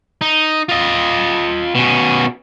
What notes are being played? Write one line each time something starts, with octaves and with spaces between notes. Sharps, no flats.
D#4
F4 D#5
B2 C#4